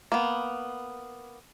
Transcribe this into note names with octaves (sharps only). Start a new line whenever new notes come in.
A#3 B3